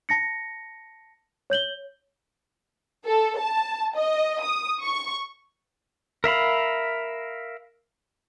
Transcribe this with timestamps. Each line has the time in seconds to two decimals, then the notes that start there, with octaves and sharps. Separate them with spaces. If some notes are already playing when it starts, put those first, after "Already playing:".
0.09 A5 A#6 C#7
1.50 C#5 G6 F#7 G7
3.05 A4
3.39 A5
3.95 D#5
4.41 D#6
4.82 C#6
6.24 A#4 E5 F5 B5